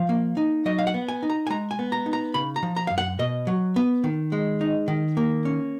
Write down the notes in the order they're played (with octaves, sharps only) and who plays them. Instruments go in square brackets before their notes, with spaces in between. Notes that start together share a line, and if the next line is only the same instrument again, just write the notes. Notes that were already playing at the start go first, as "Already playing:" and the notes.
Already playing: [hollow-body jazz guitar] F3 F5
A#3
D#4
F#3 D#5
F5
F#5
B3
G#5
D#4
A#5
G#5
G#3 A#5
G#5
B3
A#5
D#4
A#5
C#3 B5
A#5
F3
A#5
F#2 F5
F#5
B2 D#5
F#3
B3
D#3
G#3
D#4
D#3
A#3
C#4